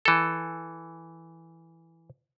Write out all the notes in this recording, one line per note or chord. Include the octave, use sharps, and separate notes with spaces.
E3 A4